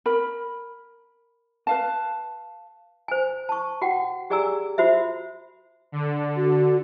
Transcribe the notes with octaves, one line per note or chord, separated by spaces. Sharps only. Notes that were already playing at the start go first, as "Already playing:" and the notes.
A#4 B5
B4 F5 A5
C5 G#5
A5 C#6
F#4 F#5 G5
G4 G#4 D5 G#5 A#5 E6
F4 F#4 C5 E5
D3
F#4